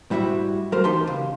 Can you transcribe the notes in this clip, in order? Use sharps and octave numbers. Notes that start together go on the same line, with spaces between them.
G#2 G3 E4 F#4 E5
F#3 A3 A#4 C5
E3 D#4 G4 A5 C6
C#2